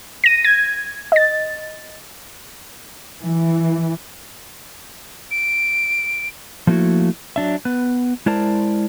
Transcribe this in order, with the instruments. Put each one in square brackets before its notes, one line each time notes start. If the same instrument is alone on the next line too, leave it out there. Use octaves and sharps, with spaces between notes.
[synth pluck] A#6 D#7
G#6
D#5 A6
[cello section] E3
[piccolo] D7
[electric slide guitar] F3 A3 A#3 E4 F#4
F#3 D4 E5
B3 B4
G#3 E4 A#4 C5 D5 A5